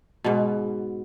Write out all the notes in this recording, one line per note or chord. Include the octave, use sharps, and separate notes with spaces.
G#2 B2